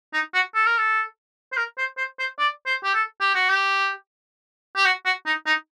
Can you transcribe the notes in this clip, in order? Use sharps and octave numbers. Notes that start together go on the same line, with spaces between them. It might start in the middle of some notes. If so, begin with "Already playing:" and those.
D#4
F#4
A4
A#4
A4
C5
A#4
C5
C5
C5
D5
C5
G4
A4
G4
F#4
G4
G4
F#4
F#4
D#4
D#4